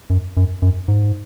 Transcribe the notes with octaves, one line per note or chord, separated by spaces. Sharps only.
F#2
F#2
F#2
G#2